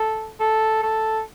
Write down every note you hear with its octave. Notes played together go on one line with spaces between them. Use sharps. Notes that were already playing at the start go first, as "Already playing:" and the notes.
Already playing: A4
A4
A4